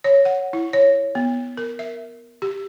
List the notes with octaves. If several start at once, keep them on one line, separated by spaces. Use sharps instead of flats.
C#5
F#5
E4
C#5
B3
A#4
E5
G4